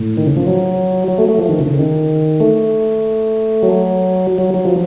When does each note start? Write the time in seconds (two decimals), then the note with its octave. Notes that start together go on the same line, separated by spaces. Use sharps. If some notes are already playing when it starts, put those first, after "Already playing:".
Already playing: A2
0.17 D#3
0.27 C#3
0.37 F3
0.47 F#3
1.08 F#3
1.18 A3
1.28 A3
1.38 F3
1.49 D#3
1.59 C#3
1.69 C#3
1.79 D#3
2.40 A3
3.63 F#3
4.38 F#3
4.54 F#3
4.65 F3